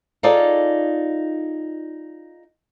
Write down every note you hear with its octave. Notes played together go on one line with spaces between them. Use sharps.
D#4 F4 G#4 A4 C#5 D5